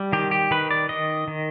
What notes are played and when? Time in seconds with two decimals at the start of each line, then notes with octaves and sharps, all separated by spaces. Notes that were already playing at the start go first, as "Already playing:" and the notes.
Already playing: G3
0.13 D#3 G4
0.31 G4
0.51 D#3 B4
0.71 D5
0.89 D#3 D#5
1.28 D#3